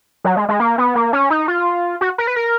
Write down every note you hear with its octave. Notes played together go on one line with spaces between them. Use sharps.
F#3
G#3
G#3
A#3
B3
A#3
C#4
D#4
F4
F#4
A#4
B4
A#4